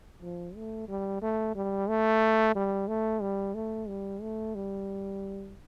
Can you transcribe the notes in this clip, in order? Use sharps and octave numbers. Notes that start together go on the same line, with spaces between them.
F3
A3
G3
A3
G3
A3
G3
A3
G3
A3
G3
A3
G3